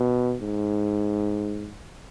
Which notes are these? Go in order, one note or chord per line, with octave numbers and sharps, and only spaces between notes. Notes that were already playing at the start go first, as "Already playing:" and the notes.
Already playing: B2
G#2